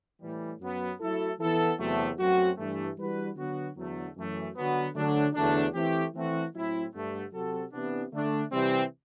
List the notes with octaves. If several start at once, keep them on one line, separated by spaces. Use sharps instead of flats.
A2 E3 G3
F#2 F#3 B3
F#3 A3 E4 A4
E3 B3 E4 A4
E2 C3 F#3 A3
F#2 F#3 A3 C4 F#4
G2 E3 A3
E3 G3 D4 F#4 B4
D3 F#3 B3 F#4
E2 D3 F#3 A3
F#2 E3 A3
D3 F#3 B3
D3 F#3 A3 D4
E2 D3 F#3 A3 D4
E3 A3 C4 G4
E3 A3 C4 F#4
A2 F#3 A3 C4 E4
G2 D3 A3
C3 F#3 C4 F#4 A4
C3 E3 B3 D4
D3 A3 D4
C3 E3 G3 C4